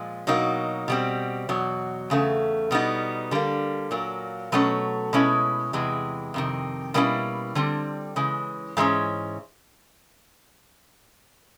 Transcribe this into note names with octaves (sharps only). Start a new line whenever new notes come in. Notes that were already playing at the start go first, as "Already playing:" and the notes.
Already playing: A#2 F3 G#3
B2 F#3 A#3 D#4
B2 G3 C4
E2 B2 F#3
E2 C#3 A3
B2 G3 B3 D#4
D3 G3 A#3
A#2 F#3 A#3
B2 F#3 A3 C#4
B2 G#3 C#4 E4
E2 C3 E3 G#3
F2 C3 D#3
B2 G3 A#3 C#4 E4
D3 G3 C4
C#3 E3 G#3
G#2 E3 G#3 C#4